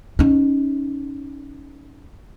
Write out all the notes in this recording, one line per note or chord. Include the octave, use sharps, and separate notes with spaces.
C#4 D#4